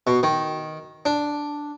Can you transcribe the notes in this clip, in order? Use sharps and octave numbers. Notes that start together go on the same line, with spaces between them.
B2
D#3
D4